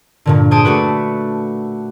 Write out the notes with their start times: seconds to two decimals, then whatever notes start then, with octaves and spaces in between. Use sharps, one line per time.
0.26 G2 A#2 D3
0.51 G#4 C5 A5 D#6 D7
0.65 A3 D4 F#4 B4